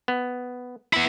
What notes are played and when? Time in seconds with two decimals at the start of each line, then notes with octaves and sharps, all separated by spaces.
0.08 B3
0.93 B3 E4